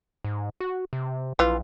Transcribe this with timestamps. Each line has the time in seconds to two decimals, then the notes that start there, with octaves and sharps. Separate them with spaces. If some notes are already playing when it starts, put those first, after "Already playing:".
0.24 G#2
0.60 F#4
0.93 C3
1.39 A#1 E3 F4